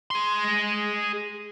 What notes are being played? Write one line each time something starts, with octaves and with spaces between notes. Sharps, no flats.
G#4 C6